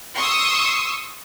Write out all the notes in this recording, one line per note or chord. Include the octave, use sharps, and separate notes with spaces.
C6 C#6 D#6 E6